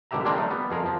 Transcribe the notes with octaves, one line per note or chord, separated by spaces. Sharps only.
G#1 B2 D3 G4 E5 A#5
G3 G#3 A#3 C4 D4
F#3 A3 D#4 A#4
G3 B3
F2 G#4 A#4 A#5
F3